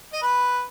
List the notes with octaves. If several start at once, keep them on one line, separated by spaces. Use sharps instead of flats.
D#5
B4